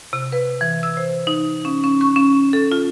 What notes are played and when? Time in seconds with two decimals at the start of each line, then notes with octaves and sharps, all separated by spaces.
0.13 C3
0.32 B4
0.61 E3
0.83 E6
0.97 C5
1.27 D#4
1.65 C#4
1.84 C#4
2.01 C#6
2.16 C#4
2.53 A4
2.72 F4